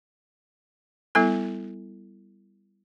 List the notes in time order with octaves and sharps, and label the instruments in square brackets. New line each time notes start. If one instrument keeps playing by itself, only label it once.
[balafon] G3 B3 E4 A4